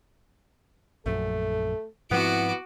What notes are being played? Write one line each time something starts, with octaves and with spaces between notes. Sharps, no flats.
A#1 F#2 A3 A4
G#2 F3 B3 C4 E4 F#4 D6